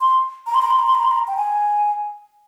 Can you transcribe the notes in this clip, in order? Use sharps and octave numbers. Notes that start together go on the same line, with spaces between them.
C6
A#5
C6
A#5
C6
A#5
C6
A#5
C6
A#5
G5
G#5